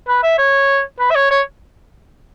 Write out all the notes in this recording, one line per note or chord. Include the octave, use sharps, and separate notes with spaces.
B4
E5
C#5
B4
E5
C#5
C#5